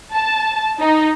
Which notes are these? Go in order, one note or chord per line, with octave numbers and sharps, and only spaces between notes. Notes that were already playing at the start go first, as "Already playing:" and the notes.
A5
D#4